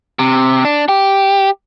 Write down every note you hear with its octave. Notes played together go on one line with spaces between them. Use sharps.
C3
D4
G4